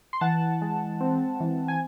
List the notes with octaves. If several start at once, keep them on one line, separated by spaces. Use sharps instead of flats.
C6
E3 F#5 A5
G#3
C4
E3
G#5